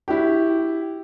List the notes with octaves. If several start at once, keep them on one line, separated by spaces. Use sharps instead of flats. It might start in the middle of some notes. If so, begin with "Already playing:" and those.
E4 F#4 G4